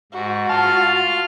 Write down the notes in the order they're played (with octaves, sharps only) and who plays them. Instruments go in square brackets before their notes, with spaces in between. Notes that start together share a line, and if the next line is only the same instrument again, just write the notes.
[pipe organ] G#2 [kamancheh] F#4
[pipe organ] F4 F6 [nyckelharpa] F5 [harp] A5